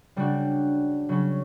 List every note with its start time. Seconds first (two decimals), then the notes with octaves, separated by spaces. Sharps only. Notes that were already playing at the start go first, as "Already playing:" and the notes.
0.16 C#3 G3 D4 F#4
1.09 C#3 F#3 C#4